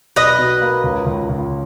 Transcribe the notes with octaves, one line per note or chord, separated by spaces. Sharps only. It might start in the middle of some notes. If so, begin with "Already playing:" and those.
B1 B4 D#5
B2
A#3
C#2
C#2
C#2